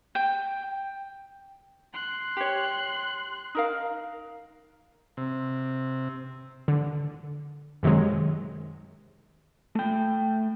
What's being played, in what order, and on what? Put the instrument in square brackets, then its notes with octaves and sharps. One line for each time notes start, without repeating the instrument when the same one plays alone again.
[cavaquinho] G5
[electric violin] C6 F#6
[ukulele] G4 C#5
D#4 A#4 F5
[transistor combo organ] C3
[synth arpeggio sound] D3
F#2 C3 D#3 F#3 G#3
[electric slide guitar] A3 G5